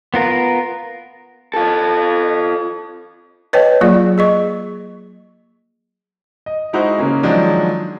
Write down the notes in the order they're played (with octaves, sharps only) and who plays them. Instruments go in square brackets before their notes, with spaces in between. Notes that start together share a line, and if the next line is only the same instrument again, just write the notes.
[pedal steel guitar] B3 F4 A#4
[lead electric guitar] F4 A4
[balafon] B4 C#5 D#5 G5 A5
F#3 A#3 F4 G#4 D5
G#4 D#5 C#6
[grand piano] D#5
G#3 D#4 E4 F#4 C5
C#3 A#3 C#4
D#3 F3 F#3 G#3 D4